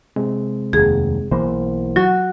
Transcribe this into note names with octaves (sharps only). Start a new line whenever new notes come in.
C3 G#3 C4
F1 D#2 G#4
B1 E3 A#3 C5
F#3 F#4